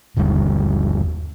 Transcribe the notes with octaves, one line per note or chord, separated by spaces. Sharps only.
G1 D#2 D3 G3